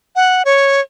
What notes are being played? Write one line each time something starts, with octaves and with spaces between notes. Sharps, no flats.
F#5
C#5